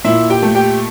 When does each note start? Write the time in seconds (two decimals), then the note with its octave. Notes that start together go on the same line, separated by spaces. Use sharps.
0.05 A#2 E4 E5
0.30 G4 G5
0.42 A3
0.55 G4 G5